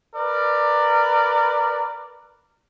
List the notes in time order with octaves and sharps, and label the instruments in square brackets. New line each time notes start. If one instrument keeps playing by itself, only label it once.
[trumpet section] A#4 B4 D5